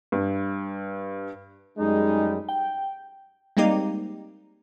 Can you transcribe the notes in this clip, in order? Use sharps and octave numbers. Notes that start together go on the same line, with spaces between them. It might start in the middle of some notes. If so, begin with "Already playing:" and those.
G2
F#2 G3 G#3 D#4
G5
G3 G#3 A#3 C4 D#4 G4